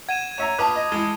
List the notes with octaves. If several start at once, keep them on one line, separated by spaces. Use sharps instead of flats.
F#5 G#6 D#7 E7
C#5 E5 A#5
A#1 B4 A5 B5 D6 D#6 F#6
D#5
E3 G#3 G7